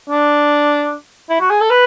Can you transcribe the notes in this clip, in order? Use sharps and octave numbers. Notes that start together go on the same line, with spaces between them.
D4
E4
F#4
G#4
A4
B4